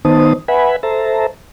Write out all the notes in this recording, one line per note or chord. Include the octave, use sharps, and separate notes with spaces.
D#3 B3 D#4 C5 A5 D#6
B4 E5 F#5 G#5 B5
A4 C5 E5 A5 A#5